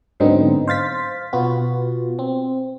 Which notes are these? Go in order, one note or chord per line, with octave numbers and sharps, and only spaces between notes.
G#2 D3 F#3 B3 C4 D#4
C5 F5 A6 B6
B2 B3 F4 F#4
C4